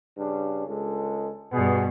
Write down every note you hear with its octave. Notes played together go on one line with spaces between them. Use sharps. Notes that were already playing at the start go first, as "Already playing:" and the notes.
G2 C#3 D4
C#2 G#3 A4
G2 B2 B3 F#4 G#4